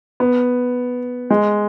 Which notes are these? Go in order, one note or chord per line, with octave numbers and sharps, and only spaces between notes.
B3
G#3